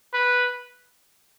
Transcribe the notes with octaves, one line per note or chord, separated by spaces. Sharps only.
B4